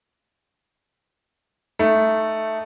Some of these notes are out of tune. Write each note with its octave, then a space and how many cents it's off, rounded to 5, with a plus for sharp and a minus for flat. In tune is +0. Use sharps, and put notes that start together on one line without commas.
A3 +0 D#4 +0